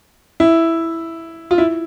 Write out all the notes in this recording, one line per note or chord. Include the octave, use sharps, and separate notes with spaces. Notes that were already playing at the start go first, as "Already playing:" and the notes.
E4
F4
E4